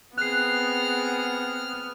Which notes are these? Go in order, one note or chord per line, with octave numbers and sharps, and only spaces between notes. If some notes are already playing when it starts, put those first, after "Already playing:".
B3 C4 G#4 F6 F#6 C7